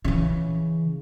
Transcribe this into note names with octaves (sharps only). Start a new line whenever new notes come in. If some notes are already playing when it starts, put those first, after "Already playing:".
C#3 E3